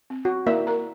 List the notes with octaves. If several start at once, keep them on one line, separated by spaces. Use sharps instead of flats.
C4
F#4
A#3 E4 D5 E5
A#4 A#5